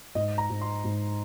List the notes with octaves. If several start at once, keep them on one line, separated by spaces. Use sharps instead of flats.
G#2 D#5
A#5
G#2
C6
G#2